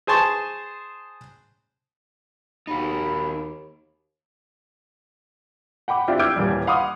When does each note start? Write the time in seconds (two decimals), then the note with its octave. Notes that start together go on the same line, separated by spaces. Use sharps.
0.07 G#4 C5 G#5 A5 C6 C#6
2.67 D#2 D#4 F#4 B5
5.88 F#5 G5 B5 D6
6.08 C4 D4 E4 F4 G4
6.19 D6 E6 F6 G6 G#6 D7
6.36 D#1 A#2 E3 G3
6.67 F5 F#5 B5 C6 D6 D#6